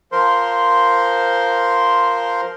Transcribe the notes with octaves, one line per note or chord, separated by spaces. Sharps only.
F3 A#4 C5 C6